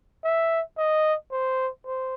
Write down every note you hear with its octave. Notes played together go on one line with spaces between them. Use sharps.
E5
D#5
C5
C5